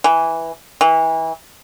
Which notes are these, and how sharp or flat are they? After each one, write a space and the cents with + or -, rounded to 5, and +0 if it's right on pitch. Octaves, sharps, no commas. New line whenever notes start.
E3 -5
E3 -25